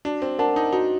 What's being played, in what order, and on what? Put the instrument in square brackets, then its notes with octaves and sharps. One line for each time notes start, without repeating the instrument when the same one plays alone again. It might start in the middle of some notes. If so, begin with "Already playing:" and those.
[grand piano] D4 [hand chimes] F#4
[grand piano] C4
[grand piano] D4 [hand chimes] A#4 F#5 A5
[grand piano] D#4
[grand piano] D#4 [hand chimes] F#4